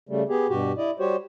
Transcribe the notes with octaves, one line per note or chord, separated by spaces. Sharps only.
C#3 G3 A3
B3 G4 G#4
G2 B2 F#4 G4
E4 D5 D#5
G3 F#4 G4 C5 C#5